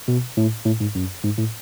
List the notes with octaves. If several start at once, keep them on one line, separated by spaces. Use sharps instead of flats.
B2
A2
A2
G#2
F#2
G#2
A2